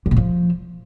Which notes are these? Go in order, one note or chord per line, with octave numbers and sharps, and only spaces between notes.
F#2
A#2
F3